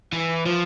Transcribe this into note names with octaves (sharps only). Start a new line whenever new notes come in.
E3
F3